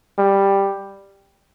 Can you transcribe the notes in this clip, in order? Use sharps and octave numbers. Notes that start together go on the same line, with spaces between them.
G3